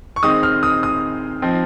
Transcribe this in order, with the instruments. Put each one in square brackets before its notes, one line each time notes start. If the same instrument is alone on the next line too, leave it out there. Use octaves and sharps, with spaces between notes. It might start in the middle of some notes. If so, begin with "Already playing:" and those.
[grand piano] C#6
D#3 G#3 C4 D#4 D#6
F6
D#6
D#6
F3 C4 D#4